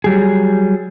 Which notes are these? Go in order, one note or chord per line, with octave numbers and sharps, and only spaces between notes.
F#3 G3 G#4